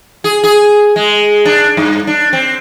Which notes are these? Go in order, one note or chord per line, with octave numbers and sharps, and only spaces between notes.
G#4
G#4
G#3
D4
G2
D4
C4